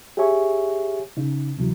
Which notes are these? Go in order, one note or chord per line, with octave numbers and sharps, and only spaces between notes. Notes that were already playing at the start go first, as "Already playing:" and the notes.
G4 G#4 C#5 E5 G#5 C#6
C#3 D#4
D2 C3 E3 F#3